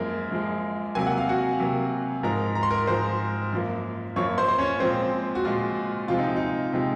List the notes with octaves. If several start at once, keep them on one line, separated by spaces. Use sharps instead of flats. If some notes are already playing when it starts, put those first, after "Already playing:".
Already playing: F#2 F3 G#3 A#3 A#4
F#2 F3 G#3
C3 F#3 A#3 G#5
F#5
F5
F#4 F#5
C3 F#3 A#3
G#2 F3 G#3 A#4 A#5
A#5
C6
A#4 A#5
G#2 F3 G#3 C5 C6
F#2 F3 A#3
F#2 F3 A#3 C#5 C#6
C5 C6
C5
C#4 C#5
A#2 F3 G#3 C4 C5
F#4
A#2 F3 G#3 F4
C3 F3 G#3 F4
D#4
D#4
C3 F3 G#3